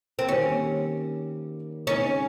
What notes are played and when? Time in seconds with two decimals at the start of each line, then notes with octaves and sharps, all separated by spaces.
0.19 C4
0.29 D#3 G3 A#3 C#4 D#4 G4
1.87 C#3 G#3 C4 C#4 D#4 G#4